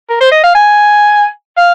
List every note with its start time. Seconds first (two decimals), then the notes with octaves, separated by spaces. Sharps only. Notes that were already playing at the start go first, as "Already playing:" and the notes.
0.10 A#4
0.21 C5
0.32 D#5
0.43 F5
0.55 G#5
1.57 F5